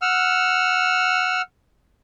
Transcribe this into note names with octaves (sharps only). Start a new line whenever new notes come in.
F#5 E6 F6